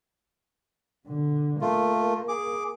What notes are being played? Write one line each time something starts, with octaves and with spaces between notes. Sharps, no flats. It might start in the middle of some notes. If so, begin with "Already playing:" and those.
B2 D3
A3 A#3 F4
G#4 D6